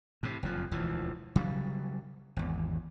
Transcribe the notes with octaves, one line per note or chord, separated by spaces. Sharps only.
A2 C3
F#1 F2 F3
E1 D2 E3 F3
C#3 F#3 G3
G#1 E2